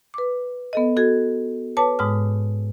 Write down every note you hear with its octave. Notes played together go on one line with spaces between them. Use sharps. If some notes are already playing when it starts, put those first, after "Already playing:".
B4 D6
B3 A4 D#5
F#4 A4 G#6
B4 C#5 A5 D6
G#2 G#3 D#6 F6